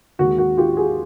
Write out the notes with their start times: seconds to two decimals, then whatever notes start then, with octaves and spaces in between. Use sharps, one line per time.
0.19 D#2 D#3 G#3 F#4
0.38 F#4
0.57 F4 G4
0.77 F#4 G#4